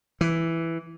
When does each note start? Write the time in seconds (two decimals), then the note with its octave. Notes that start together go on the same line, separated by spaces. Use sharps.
0.21 E3